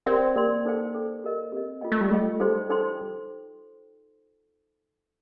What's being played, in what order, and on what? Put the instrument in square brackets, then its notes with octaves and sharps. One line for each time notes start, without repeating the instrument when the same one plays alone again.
[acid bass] C4 [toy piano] G4 A#4 D5 G5 C6
[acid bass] A#3 [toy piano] G4 A#4 D5 G5 C6
[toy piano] D#4 A4 C5 G5
D#4 A4 C5 G5
G4 A#4 D#5
[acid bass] C4 [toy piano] G4 A#4 D#5
[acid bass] A#3 [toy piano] F4 A4 D#5 G5
[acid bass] A3
G3
[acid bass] A3 [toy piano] F4 A4 D#5 G5
[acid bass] G3 [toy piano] D#4 A4 C5 G5 C6
[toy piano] D#4 A4 C5 G5 C6